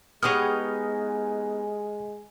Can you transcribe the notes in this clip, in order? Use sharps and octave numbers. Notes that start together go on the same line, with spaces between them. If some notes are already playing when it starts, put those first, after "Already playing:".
G#3 B3 D#4 G4 G#4 C#5 D#6 F6